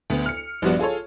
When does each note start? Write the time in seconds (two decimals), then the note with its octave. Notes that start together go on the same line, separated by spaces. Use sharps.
0.10 D2 B3
0.26 F6 C#7
0.62 A#1 G2 F3 B3 F#4 D5
0.79 F4 G#4 A4 C#5